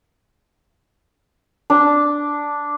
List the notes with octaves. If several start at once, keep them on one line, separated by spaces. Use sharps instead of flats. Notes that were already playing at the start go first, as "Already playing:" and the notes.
D4